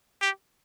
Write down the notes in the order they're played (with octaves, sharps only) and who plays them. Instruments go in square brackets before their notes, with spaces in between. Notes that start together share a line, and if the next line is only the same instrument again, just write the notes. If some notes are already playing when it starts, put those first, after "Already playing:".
[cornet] G4